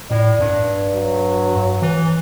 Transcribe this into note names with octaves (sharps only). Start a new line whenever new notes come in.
A2 D5
G2
F#3
E3